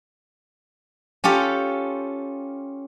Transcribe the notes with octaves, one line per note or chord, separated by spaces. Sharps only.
C#4 F4 G4 A4